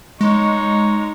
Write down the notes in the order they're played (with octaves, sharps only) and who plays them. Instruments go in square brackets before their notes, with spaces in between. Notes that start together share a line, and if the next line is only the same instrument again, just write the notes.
[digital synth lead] G#3 [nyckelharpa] D#4 C#5